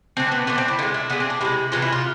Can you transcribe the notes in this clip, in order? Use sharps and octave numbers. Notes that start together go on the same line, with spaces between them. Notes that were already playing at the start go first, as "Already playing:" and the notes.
D3 A3 C4
B3
D3 A3 B3
C4
E4
D3 G#3 F4
E4
D3 G#3 B3
C4
D4
C3 E3 G#3 E4
C3 E3 G#3 F4
E4
F4